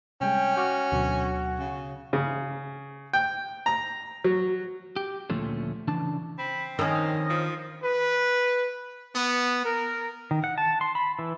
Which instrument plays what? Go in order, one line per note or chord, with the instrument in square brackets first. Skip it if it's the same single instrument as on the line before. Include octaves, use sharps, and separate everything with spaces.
[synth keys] C3 G3 G#3 [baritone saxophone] C#4 [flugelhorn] G5
[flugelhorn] F#4 [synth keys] C#6 D6 F6
[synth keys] D2 B2 F#3
[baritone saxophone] C#3
[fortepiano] C#3
G5
A#5
F#3
[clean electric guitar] G4
D2 A#2 F3 A3 C#4
C#3 E3 D4 A5
[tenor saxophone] C4 [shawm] B5
[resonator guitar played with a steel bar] F2 C#4 [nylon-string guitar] D#3 D4 A#4 [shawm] D#5
[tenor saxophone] F3
[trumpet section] B4
B3
A#4
[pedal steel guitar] D#3
F#5
A5
C6
B5
E3